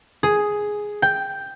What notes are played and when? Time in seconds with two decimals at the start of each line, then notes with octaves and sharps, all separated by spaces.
0.23 G#4
1.02 G5